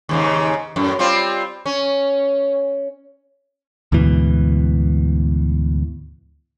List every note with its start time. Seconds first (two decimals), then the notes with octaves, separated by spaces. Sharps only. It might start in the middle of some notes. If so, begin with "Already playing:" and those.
0.09 D#2 G#2 C#3
0.76 F#2 A2
0.99 G3 C4 F4
1.66 C#4
3.92 D2 G#2 B2 E3